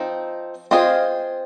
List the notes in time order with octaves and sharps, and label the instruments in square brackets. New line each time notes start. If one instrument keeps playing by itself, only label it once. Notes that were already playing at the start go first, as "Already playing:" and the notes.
Already playing: [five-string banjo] F3 C4 D#4
C4 F4 G#4 C5 D#5